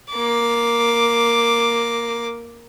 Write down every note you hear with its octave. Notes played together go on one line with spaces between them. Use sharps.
A#3 D6